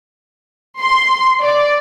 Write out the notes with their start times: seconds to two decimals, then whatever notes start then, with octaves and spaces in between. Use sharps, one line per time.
0.80 C6
1.41 D5